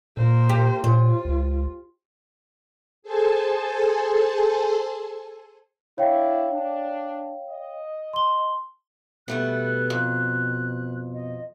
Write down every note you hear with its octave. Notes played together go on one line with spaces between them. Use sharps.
A#2 A#3 C5
G4
A#2 F4 C5
C#2
G#4 A4 C5 G#5 A5
D4 E4 C#5 F5 G5
D4
D#5
C6 G7
B2 G3 A3 B3 F#6
F2
D#5